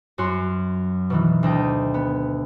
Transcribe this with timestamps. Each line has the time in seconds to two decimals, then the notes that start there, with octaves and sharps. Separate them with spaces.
0.18 F#2 C#4 F#4 C6
1.10 B2 D#3 E3
1.43 D2 D4 D#5 G5
1.94 B3